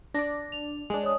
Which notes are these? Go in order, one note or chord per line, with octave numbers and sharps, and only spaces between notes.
D4 D5 A#6
F7
G#3 D4
C#5 D#6